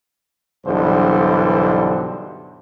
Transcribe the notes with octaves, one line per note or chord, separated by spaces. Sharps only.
B1 G2 D3 E3 C5